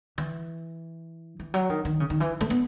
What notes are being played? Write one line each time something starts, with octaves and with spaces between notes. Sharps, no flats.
E3
E3
F#3
D#3
D#3
C#3
D#3
E3
A3
B3